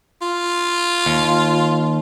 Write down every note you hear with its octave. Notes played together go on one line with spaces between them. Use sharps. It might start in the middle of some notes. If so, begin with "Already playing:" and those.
F4
D#2